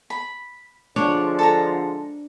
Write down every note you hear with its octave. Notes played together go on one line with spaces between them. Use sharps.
B5
D3 F3 G#3 D4 C#5
A4 A#5